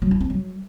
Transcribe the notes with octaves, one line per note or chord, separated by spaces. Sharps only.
F#3
E4
C4
F#3